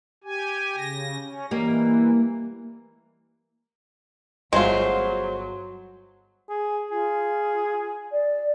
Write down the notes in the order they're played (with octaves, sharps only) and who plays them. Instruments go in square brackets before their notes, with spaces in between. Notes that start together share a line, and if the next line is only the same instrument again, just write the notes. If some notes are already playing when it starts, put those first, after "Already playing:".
[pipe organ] G4 G#5
C#3 A#6
C#4
[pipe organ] E3 [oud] G3 A#3 D#5
[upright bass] G1 [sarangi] F#3 [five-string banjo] G#3 A3 F4 [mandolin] C5
[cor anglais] G#4
[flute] F4 [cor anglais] G#4
[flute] D5